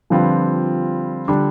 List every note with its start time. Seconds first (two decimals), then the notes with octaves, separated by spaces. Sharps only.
0.10 D3 F3 G3 C4 F4 B4
1.28 D3 G3 D4